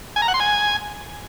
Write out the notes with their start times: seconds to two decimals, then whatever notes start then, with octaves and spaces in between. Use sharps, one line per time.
0.16 G#5
0.22 A#5
0.28 F#5
0.34 C6
0.40 G#5